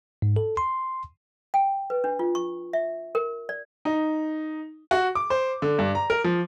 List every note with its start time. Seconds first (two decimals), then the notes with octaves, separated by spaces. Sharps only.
0.22 G#2
0.36 A4
0.57 C6
1.54 G5
1.90 B4
2.04 D4
2.19 F4
2.35 C#6
2.73 E5
3.15 A#4
3.49 D5
3.85 D#4
4.91 F#4
5.15 D6
5.30 C5
5.62 D3
5.79 G2
5.95 A#5
6.10 A#4
6.24 F3